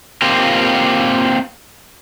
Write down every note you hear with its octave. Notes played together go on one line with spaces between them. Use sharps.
A#3 C4 F4 G4